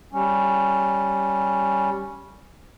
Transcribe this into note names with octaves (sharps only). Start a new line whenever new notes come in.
G3 C#4